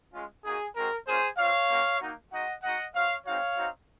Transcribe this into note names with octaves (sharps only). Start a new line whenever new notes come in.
G#3 C#4 F4
A#3 D#4 F#4 G#4
G#3 C4 F#4 A#4
A#3 C#4 F4 G#4 C5
C4 F4 C#5 F5
A#3 C#4 F#4
A#3 D#4 F#4
G#3 D#4 F#4 D#5 F#5
G#3 D#4 F#4 D#5 F#5
C4 F#4 C#5 F5
G#3 C4 D#4 F#4 C#5 F5
C4 D#4 F#4